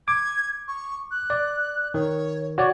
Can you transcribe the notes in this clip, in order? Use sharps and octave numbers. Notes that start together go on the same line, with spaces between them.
D6 G#6
C#6
F#6
D5
D#3 C#5
F#4 C#5 D5